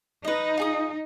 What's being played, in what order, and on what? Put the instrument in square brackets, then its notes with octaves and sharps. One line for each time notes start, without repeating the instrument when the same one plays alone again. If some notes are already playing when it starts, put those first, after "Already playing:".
[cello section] D#4 [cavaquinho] B4 D#5
[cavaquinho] F4 G#4 D#6